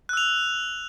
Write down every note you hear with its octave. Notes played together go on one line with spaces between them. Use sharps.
E6 F#6 F7